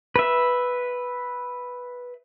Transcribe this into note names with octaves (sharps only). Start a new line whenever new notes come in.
B4 E5